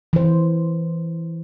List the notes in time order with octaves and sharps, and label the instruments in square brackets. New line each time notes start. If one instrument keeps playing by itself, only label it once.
[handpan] E3 C5